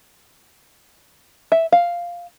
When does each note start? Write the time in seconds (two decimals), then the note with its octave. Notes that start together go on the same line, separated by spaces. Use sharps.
1.52 E5
1.72 F5